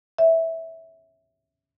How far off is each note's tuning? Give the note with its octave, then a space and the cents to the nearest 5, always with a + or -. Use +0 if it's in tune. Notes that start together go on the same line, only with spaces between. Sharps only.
C#5 +0 E5 -10